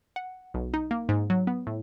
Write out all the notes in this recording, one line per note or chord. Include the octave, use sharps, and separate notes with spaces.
F#5
B1
D#4
A#3
G#2
F#3
B3
A2